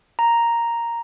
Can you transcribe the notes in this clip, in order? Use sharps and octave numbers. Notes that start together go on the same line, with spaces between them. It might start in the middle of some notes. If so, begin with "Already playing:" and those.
A#5